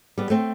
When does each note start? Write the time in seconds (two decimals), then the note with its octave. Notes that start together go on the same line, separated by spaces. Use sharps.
0.18 G3 B3
0.30 A3 C4